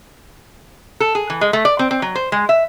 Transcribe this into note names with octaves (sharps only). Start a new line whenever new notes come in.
A4
G#4
E3
G#3
A3
D5
C4
C4
F#3
C5
G#3
E5